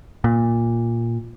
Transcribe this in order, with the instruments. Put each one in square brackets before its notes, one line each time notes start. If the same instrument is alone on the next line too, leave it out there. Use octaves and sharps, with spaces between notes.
[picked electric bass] A#2